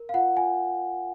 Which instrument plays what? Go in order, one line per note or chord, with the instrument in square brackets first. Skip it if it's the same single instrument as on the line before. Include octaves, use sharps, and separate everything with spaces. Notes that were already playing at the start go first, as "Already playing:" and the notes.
Already playing: [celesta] A#4
F5
F4 F#5
F4 G#5